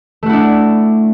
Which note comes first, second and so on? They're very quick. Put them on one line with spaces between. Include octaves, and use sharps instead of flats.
A3 F#4 E4 D4